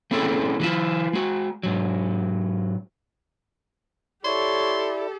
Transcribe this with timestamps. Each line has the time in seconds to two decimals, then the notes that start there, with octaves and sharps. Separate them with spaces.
0.11 A3 C4 C#4 E4 G#4 A4
0.60 E3 G3 B3 E4 F4
1.13 G#3 F#4
1.63 G#2 F#3
4.25 E4 G4 A4 C#5 D5 C6